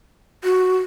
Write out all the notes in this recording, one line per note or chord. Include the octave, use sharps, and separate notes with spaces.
F#4